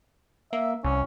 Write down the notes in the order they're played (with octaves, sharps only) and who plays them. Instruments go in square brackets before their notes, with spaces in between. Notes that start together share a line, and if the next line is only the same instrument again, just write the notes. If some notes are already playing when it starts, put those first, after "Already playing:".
[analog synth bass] A#3 [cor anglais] E5
[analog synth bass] C2 [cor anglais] C#4